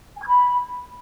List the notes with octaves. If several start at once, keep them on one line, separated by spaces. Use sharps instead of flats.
G#5
G#6
B5